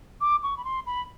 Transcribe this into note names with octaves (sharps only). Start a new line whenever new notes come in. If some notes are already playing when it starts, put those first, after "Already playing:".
D6
C#6
B5
C6
B5